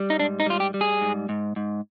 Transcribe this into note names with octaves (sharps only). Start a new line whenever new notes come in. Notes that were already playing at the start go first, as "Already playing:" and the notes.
Already playing: G3
D#4
G#2 D4
D#4
G3 F4
G4
G3
G#4
G#2
G#2
G#2